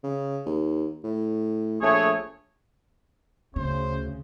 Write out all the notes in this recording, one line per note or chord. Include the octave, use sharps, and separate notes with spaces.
C#3
D#2
A2
A#1 A3 G#4 C#5
D2 C#3 C#4 C5